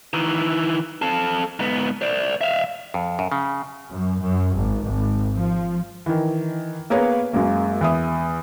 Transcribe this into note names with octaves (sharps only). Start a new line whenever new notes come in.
D#3 E3
C4 A4
G#2 B3
C5 D5
E5 F5
F2
F#2
C#3
F#2
F#2
G#1
G#1
F3
D#3 E3
A#3 B3 G#4 A#4 B4 C#5
F#2 G#3 A#3
E2 E5 D#6